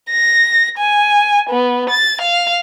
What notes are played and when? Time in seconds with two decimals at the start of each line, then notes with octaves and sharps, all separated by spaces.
0.11 A#6
0.78 G#5
1.50 B3
1.90 A6
2.22 F5